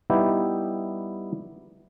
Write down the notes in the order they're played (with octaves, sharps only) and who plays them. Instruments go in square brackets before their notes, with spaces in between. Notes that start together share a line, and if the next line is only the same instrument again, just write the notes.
[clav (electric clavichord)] G3 B3 D#4 E4 G4